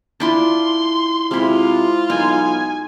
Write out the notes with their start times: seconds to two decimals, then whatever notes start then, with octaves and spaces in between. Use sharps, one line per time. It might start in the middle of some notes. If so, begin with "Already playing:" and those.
0.20 D4 E4 F4 C6
1.31 C3 G#3 E4 F4
2.10 B1 D#4 G#5